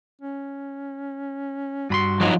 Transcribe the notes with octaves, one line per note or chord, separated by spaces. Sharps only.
C#4
G2 F#4 B5 C6
F3 F#3 D#4